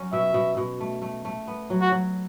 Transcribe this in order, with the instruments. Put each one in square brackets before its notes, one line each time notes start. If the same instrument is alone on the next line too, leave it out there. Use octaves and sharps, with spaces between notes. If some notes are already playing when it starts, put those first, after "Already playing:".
Already playing: [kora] F#3 C#4
[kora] B2 [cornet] E5
[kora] B2
B2
A3
A3
A3
B3
F#3
[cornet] F#4
[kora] F#3